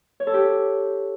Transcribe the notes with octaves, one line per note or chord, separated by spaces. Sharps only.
C#5
A4
G4